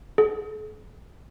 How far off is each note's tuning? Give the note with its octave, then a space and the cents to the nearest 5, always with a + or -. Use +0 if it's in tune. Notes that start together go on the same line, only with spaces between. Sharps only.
A4 -45